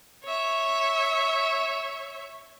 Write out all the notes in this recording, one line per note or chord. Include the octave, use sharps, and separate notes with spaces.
C#5 E5